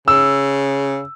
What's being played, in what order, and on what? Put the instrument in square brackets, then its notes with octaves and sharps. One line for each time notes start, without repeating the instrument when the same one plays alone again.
[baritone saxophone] C#3 [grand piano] E6